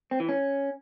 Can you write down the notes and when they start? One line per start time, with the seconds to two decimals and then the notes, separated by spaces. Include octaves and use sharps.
0.11 C4
0.20 E3
0.29 C#4